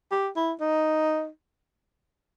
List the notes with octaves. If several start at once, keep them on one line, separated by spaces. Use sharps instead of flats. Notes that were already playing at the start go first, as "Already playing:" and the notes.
G4
E4
D#4